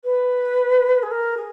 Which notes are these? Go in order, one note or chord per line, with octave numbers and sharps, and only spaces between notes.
B4
G#4
A#4
G#4